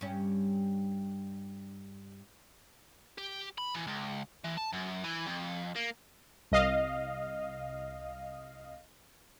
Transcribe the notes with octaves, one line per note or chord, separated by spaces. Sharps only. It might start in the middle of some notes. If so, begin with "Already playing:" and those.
G2 C#4
G4
B5
E3
C#2
E3
A5
F#2
E3
F2
A#3
C2 D#5 F5